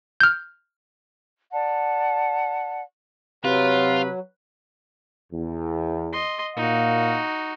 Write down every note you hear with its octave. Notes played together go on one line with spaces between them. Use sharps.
F6 G6
D5 F#5 A5
C3 F#3 F4 B4
E2
D#5 C6
A#2 D#4 F#4 F5